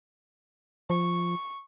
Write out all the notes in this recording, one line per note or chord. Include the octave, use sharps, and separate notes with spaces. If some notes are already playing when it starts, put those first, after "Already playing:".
F3 C#6